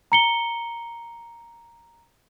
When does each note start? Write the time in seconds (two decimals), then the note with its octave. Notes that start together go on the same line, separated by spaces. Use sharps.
0.12 A#5 C#7 G7